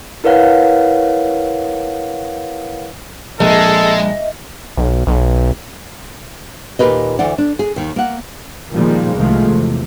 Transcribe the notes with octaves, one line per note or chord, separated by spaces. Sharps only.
E4 A#4 B4 C#5 F5 F#5
A#1 G#3 A4 D#5 E5
B1
B1
D#2 A#2 G4 A#4 B4 D#5
D2 E3 D5 F#5
D4
G#4
D#2 D#3
A#3 F#5
A#2 D#3 F3 G3 G#3 A#3
C2 C3 D#3 F3 G#3 A3
E2 C3